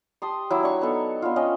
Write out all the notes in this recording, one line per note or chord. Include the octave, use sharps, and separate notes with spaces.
G4 A5 C6 D#6
F#3 E4
D4 C#6
B3 D#4 A4
B3 D4 F4
C#4 D#5 G5